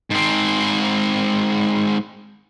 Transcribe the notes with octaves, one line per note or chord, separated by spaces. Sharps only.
G#2 C4